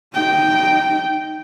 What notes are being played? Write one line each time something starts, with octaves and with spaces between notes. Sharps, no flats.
D#4 G5